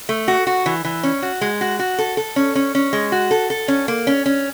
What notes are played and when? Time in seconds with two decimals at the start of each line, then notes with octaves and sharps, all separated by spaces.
0.09 A3
0.28 F#4
0.47 F#4
0.66 E3
0.85 E3
1.03 C#4
1.22 F#4
1.41 G#3
1.61 F#4
1.79 F#4
1.99 A4
2.17 A4
2.36 C#4
2.55 C#4
2.75 C#4
2.93 G#3
3.12 F#4
3.31 A4
3.50 A4
3.68 C#4
3.88 A#3
4.07 C#4
4.26 C#4